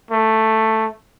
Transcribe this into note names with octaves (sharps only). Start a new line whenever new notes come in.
A3